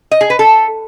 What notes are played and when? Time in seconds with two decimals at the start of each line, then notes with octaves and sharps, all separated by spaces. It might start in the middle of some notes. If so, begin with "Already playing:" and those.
0.11 D#5
0.21 G#4
0.30 B4
0.39 A4